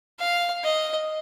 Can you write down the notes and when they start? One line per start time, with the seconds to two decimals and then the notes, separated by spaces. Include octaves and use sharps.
0.19 F5
0.64 D#5